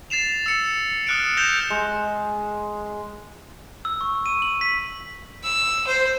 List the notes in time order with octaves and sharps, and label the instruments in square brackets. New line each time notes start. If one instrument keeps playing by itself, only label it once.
[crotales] A6 C7 E7 F7
E6 C#7
D#6 F6 F#6 C#7 D7
G6 A#6 E7 F7 G7
[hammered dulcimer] G#3
[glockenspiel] E6
C#6
D#7
F#7
B6
[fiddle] E6
C5